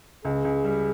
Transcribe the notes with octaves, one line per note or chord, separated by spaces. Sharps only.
C#2 G#4
C#2
G3